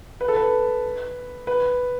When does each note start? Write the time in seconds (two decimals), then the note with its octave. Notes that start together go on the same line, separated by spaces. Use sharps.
0.21 B4
0.28 A4
0.36 B4
1.47 B4